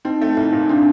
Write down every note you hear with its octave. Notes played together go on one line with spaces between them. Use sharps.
C4 D#4
A3
C2 D#4
A#2
C4 D4